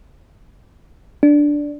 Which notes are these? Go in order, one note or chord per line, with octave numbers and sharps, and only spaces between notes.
D4